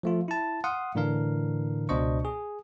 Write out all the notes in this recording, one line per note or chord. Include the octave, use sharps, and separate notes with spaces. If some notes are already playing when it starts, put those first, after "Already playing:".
F3 A3 F4
E4 A5
F5 F#5 C6 D#6
A2 D3 E3 D4 A#4 F5
C#2 B2 D4 C5 D#5 C#6
G#4